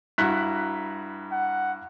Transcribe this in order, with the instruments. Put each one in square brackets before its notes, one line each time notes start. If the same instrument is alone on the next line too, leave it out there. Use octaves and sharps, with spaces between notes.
[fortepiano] G2 E4 F#4 [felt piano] A#5 F#6 B6
[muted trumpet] F#5